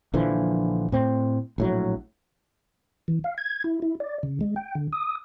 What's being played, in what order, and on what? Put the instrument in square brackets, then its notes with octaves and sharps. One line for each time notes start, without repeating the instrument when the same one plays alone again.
[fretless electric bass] A#1 D3 E3 F3
A2 C4
A#1 A2 F#3
[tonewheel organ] E3
F5
G#6
E4
E4
D5
C#3
G#3
G5
D3
D#6